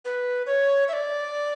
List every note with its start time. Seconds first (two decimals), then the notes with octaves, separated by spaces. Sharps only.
0.05 B4
0.47 C#5
0.88 E5
0.93 D5